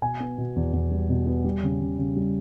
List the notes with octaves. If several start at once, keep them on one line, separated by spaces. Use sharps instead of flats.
B2 G#5
B3
B2
E2
E2
G3
B2
B3
G3
C#3
C#3
C#3
G3